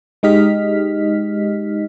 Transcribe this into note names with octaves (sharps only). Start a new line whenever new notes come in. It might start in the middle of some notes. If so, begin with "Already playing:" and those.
G#3 D#4 G4 D#5 F6 B6